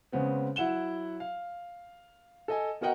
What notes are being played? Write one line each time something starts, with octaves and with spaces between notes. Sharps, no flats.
C#3 G#3 B3 C4
F#3 E4 F#5 E7 G7
F5
A4 D#5 G#5
B3 F#4 A#4 D#5 F#5 G5